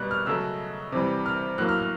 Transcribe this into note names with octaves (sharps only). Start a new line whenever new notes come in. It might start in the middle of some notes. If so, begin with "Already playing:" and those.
Already playing: B2 G3 B3 F#6
F6
C#3 F#3 A3 E6
C3 E3 G3
F6
A2 F#3 A#3 F#6
F6
F6